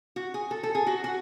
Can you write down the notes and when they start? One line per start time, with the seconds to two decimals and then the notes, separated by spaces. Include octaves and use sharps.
0.16 F#4
0.34 G#4
0.51 A4
0.63 A4
0.75 G#4
0.87 F#4
1.04 F#4